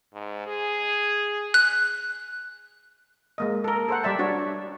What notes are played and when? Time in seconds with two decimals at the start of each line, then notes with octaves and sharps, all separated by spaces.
0.14 G#2
0.47 G#4
1.54 F#6
3.38 G#3 A#3 D#5
3.64 A4 A#4
3.88 A4 C5 F#5
4.03 G3 D5 E5 A5
4.19 D4 F#4 C#5